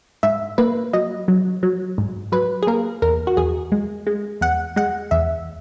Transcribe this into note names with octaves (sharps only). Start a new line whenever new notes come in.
G#2 E5
A#3 B4
F#3 D#5
F#3
F#3
G#2
F#3 B4
G#4
A#3 A#4
E2 A#4
F#4
E2 G#4
G#3
G#3
E2 F#5
G#3 F#5
E2 E5